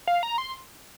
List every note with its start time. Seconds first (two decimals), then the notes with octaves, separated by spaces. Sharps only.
0.07 F5
0.23 A#5
0.38 C6